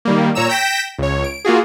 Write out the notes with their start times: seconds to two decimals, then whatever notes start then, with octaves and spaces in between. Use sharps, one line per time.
0.05 D#3 G3 A#3
0.35 A#2 C#5 A#5 E6 E7
0.49 G5 G6 A#6 B6 D7 E7
0.98 C#2 C#5
1.24 D7
1.45 A#3 F4 F#4 G#4